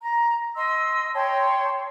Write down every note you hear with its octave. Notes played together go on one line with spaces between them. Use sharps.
A#5
D#5 C6 E6
C#5 G5 A5 C6